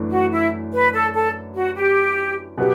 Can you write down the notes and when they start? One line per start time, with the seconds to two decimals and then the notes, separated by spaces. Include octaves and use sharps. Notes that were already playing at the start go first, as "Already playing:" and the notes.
Already playing: F#2 E3 A3 D4
0.11 F#4
0.32 E4
0.73 B4
0.93 A4
1.14 A4
1.55 F#4
1.76 G4
2.58 B2 F#3 B3 G4